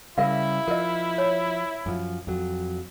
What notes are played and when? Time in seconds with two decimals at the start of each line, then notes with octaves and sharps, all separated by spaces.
0.18 C#3 G3 E4 A#4 E5 F5
0.68 F3 A#4 D#5
1.18 C#5
1.86 F#2 F3
2.27 F2 F#3